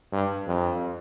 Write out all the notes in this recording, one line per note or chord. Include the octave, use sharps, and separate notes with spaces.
G2
F2